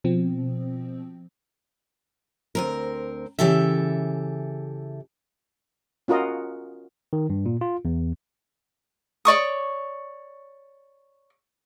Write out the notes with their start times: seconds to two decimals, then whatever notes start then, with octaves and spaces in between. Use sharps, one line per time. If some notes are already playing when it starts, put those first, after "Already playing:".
0.04 B2 F3 C4
2.55 D2 C4 A#4
3.39 C#3 E3 G4 A4 E5
6.08 C#4 F4 F#4 A#4 D#5
7.13 D#3
7.30 G2
7.46 A#2
7.61 F4
7.85 E2
9.25 C#5 D5 C#6 D#6